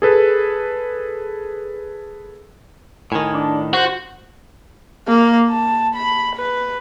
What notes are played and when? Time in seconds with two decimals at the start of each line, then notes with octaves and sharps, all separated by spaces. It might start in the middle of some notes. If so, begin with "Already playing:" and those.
0.02 G#4 A4 B4
3.12 A2 D#3 G#5
3.34 D4
3.73 F#4 C5
5.08 A#3
5.49 A5
5.95 B5
6.35 B4